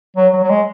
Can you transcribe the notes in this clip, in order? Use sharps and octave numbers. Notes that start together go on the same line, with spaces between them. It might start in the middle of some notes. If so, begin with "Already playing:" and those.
F#3
F#3
F#3
G#3